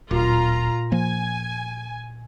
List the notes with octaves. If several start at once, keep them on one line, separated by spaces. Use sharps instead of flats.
D1 A#2 F4 A#5
F3 A#3 G#5